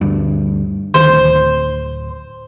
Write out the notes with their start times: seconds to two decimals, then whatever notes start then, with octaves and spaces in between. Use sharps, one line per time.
0.01 D2 G2
0.94 D2 D#3 C5
1.10 D1